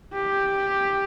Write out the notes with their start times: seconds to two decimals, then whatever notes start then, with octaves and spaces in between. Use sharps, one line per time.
0.14 G4